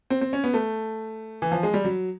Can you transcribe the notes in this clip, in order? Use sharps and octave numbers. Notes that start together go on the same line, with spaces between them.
C4
C4
C#4
B3
A3
E3
F3
G#3
G3
F#3